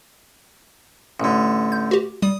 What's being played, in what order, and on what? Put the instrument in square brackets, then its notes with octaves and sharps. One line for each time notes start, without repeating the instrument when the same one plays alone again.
[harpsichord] A1 D3
[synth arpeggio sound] G6
F#4 G4
[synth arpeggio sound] G3 [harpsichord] D#6